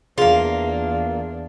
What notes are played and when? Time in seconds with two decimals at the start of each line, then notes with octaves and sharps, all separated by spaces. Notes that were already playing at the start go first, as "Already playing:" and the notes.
0.18 E2 A#3 D4 F4 G#4 F5